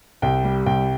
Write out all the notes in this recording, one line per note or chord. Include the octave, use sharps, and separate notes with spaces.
C2 G5
G3
C2 G5